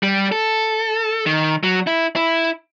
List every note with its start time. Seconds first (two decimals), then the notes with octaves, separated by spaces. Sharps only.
0.03 G3
0.32 A4
1.26 D#3
1.63 F#3
1.87 E4
2.16 E4